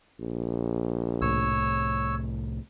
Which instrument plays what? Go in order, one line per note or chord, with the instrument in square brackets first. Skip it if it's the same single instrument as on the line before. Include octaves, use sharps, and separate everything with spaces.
[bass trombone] A#1
[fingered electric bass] C2 A2 [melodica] C#5 E6